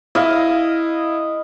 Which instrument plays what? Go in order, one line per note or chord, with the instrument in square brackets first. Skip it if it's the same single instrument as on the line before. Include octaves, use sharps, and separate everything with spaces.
[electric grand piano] E4 [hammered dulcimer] D#5 F5